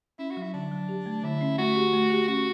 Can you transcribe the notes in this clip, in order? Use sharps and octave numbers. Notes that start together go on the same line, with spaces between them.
C#4 E4
F#4
F#3
E4
D3 D4
F#3
G4
A3
D3 E4
C#4
A3 F#4
G4
A3
G4
C#4 F#4